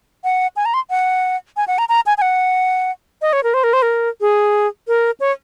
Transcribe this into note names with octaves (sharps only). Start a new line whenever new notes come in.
F#5
G#5
A#5
C6
F#5
G#5
F#5
A#5
A#5
G#5
G#5
F#5
D#5
C#5
A#4
C5
A#4
C5
A#4
G#4
A#4
C#5